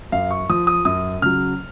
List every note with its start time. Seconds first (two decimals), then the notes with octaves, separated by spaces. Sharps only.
0.12 F#2 F5
0.31 C#6
0.49 F3 D#6
0.67 D#6
0.85 F#2 D#6
1.22 C#3 F#3 F6